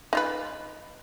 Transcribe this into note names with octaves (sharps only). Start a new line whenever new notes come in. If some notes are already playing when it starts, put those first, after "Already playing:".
D#4 F4 B4